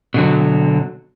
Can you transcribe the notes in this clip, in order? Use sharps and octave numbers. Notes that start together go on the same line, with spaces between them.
B2 D3 F#3